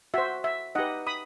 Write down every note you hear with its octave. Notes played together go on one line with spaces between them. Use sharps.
F#4 C5 E5
E5
D#4 G4 B4 D#5 F#5
B5 D#6